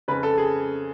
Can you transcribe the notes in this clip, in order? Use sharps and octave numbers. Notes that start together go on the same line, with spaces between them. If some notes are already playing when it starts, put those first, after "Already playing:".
F2 C#3 B4
A4
G#4